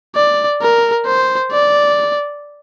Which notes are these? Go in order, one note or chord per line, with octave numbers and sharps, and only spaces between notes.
D5
A#4
C5
D5